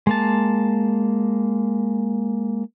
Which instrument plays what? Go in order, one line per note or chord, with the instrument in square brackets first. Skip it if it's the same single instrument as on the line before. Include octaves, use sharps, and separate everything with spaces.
[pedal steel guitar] G#3 A#3 A5